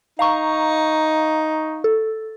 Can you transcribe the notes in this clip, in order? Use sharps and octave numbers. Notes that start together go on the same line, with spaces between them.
D#4 F5 A#5 C#6
A4